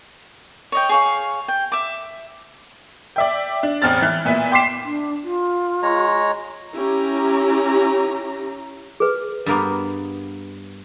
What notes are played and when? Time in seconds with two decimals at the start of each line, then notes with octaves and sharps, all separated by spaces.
0.72 C#5 D#5 G5
0.89 G#4 C#5 F5
1.48 G5
1.72 E5 D6
3.16 D5 E5 G5
3.63 D4
3.82 A1 E2 C4 F6 A6
4.02 E3
4.25 A#2 B3 E4
4.52 G5 C6 D6 B6 C7 E7
4.83 D4
5.23 F4
5.83 G#3 C#5 A#5
6.15 D#5
6.74 C#4 E4 G4 A#5
9.00 G#4 B4
9.46 G2 A#3 B3